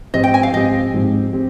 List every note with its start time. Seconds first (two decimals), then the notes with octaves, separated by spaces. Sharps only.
0.14 G#2 F3 C4 G4 D#5
0.24 G5
0.34 G#5
0.43 F5
0.54 G#2 F3 C4 G4 D#5
0.94 G#2 F3 C4 G4
1.33 C4 G4